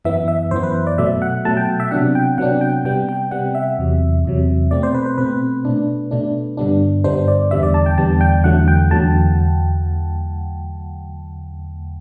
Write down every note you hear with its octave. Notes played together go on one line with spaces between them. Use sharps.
F#2 E3 B3 E5
E5
F#2 E3 B3 C5
B4
D5
B2 F#3 A3 E5
F#5
B2 F#3 A3 A5
G5
E5
C3 F#3 B3 D4 F#5
G5
C3 F#3 B3 D4 F#5
G5
C3 G3 B3 G5
G5
C3 G3 B3 F#5
E5
E2 C3 F#3
E2 C3 F#3
B2 A3 C4 D5
C5
B4
C5
B2 A3 C4 B4
B2 A3 D4
B2 A3 D4
G2 D3 G3 B3 D4
G2 D3 G3 B3 D4 C5
D5
E2 D3 G3 B3 E5
D5
A5
G5
E2 D3 G3 B3 A5
G5
E2 D3 F#3 A3 F#5
G5
E2 D3 F#3 A3 A5